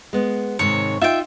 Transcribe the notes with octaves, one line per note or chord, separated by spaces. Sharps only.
G#3 B3
G#2 C3 D#3 C#5
D#4 F4 E5 G5